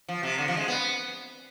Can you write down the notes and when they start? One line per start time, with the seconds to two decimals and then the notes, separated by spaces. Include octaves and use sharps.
0.09 F3
0.23 C3
0.38 D3
0.48 F3
0.57 G#3
0.68 B3